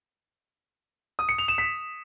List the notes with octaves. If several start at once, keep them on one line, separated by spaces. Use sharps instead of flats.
D#6
C#7
F7
E7
B6